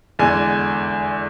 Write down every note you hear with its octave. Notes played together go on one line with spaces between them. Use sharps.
E2 D3 G#3 G#5